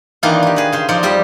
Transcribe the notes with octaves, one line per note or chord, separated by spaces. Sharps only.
D#3 E3 A#3 D4 D#4 F4
D#4 G4
G#4 B4
C#3 C5
F3 D#4 C5 D5
F2 G3 G4 E5